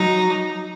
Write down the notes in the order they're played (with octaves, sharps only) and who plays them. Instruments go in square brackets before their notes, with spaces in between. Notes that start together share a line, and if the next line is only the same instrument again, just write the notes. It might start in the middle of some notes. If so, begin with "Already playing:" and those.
Already playing: [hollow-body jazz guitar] F#3 [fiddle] D#4